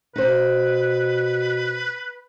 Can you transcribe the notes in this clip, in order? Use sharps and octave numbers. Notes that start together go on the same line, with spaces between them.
B2 D#4 B4 C5